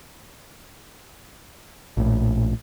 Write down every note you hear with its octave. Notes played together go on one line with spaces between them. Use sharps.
A#1 A2